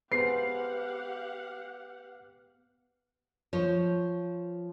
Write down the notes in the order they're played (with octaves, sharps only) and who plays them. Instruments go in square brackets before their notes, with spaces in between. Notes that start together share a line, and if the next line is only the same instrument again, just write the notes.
[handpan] B3 G#4 C5 [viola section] G4 F5 F#5 [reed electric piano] B4 [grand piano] C7
[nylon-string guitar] F3 C5 C#5